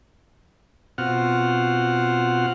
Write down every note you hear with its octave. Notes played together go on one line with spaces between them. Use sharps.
B2 C4 F4 F#4 F#5 F6